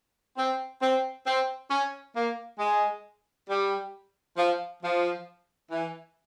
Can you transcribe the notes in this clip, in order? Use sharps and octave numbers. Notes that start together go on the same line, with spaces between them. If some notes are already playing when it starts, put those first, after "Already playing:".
C4
C4
C4
C#4
A#3
G#3
G3
F3
F3
E3